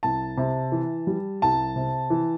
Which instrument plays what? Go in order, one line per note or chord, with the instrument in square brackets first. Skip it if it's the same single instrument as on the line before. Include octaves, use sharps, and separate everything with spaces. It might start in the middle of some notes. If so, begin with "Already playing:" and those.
[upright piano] C2 A5
C3
E3
G3
C2 A5
C3
E3